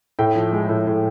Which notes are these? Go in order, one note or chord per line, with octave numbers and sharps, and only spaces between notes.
A2 G5
F3
G#3
A2
A2